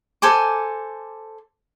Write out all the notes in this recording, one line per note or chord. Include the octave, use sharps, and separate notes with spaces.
A4 C5 G#5 D6